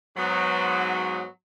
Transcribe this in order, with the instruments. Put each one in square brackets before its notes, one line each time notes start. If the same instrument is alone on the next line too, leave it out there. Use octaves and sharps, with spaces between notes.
[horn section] G#2 F#3 B3